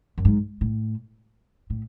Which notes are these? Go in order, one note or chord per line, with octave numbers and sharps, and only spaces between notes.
F#2
G#2
A2
A2